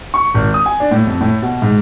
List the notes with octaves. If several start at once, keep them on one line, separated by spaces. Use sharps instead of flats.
C#6
G#1
D#6
G#5
D4
A2
F2
A2
B2
G#2